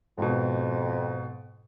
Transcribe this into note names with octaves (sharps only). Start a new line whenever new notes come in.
F2 G#2 B2